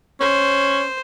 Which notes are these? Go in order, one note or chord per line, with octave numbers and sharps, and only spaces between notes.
C#4 C5